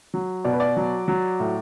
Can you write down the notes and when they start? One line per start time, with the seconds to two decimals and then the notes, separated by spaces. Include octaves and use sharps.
0.14 F#3
0.45 B2 D5
0.53 B4
0.60 D5
0.77 F#3
1.08 F#3
1.40 A2